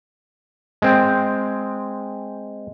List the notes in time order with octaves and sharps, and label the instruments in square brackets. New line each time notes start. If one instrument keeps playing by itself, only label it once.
[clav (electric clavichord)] G#3 C4 G5